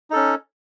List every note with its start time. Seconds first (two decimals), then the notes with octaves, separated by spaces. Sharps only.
0.10 D#4
0.13 A4
0.15 C#4